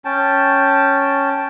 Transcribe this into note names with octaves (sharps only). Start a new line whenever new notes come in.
C#4 G5 A5